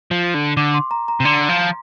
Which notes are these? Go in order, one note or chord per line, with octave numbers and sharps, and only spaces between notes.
F3
D3
D3 D6
C6
A#5
A#5
C3
D3 C6
F3